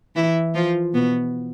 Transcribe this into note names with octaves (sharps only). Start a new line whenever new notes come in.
E3 E4
F3 F4
B2 B3